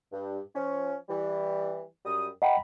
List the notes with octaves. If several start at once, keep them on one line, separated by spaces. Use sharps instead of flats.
G2
F3 C#4
E3 G3
F#2 G3 D#6
D#5 F#5 G5 A#5 B5